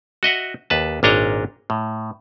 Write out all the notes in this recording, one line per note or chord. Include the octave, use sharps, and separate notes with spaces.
F#4 D#5 E5 F#5
D#2 B4 A5
G#1 A#2 D4 C#5 D#5 A#5
A2